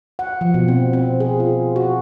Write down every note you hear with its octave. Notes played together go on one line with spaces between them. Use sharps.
F#5
F3
B2
C4
C4
G#4
F4
F#4